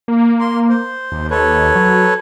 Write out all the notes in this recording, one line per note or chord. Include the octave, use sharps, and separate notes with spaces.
A#3
C6
C5
D#2
A4 B4 C#5
F#3